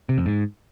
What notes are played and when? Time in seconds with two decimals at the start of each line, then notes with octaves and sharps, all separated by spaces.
0.09 C3
0.17 F2
0.26 G#2